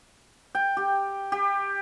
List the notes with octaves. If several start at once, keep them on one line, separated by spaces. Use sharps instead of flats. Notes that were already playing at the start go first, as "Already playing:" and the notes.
G5
G4
G4